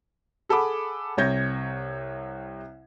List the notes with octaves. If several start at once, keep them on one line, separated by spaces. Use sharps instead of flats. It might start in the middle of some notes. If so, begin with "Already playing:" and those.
G#4 A4 F#5 B5 D6
C2 C3 C#5 G6 G#6 A#6